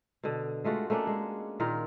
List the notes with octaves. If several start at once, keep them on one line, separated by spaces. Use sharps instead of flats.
B2 D3
G#3 A3 F4 F#4
A3 A#3 C#4 D4
G#3
A#2 D#3 F4 A#4